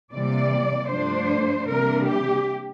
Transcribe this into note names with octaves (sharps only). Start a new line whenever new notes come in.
C3 E3 G3 A#3 D5
G2 F3 A3 D4 C5
C3 E3 G3 A#3 D4 A#4
G4